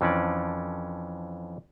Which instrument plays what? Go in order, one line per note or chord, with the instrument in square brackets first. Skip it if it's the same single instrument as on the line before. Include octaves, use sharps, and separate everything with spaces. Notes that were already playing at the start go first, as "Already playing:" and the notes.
[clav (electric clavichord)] F2 E3 F3 C#4 D4 D5